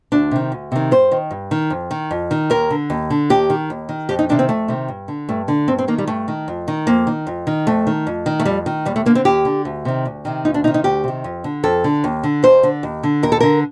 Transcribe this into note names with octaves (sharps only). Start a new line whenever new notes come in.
D2 D4
C3 D#3
D2
C3 D#3
G2 C5
D#3
G2
D#3
F2
D#3
F2
D#3
D#2 A#4
D3
D#2
D3
D#2 G4
D#3
D#2
D#3
F2 G4
D#4
C3 D#3 D4
C4
F2 A3
C3 D#3
G2
D3
G2 A3
D3
G2 C4
C4
D#3 A#3
G3
G2 A3
D#3
F2
D#3
F2 A#3
D#3
F2
D#3
F2 A3
D#3
F2
D#3
A3
F2 G3
D#3
D#2 G3
A3
D3 A#3
C4
D#2 G4
D3
D2
C3 D#3
D2
C3 D#3
D2 D#4
D4
C3 D#3 D#4
D#4
D2 G4
C3 D#3
F2
D3
F2 A4
D3
D#2
D3
D#2 C5
D3
D#2
D3
D#2 A#4
A4
D3 A#4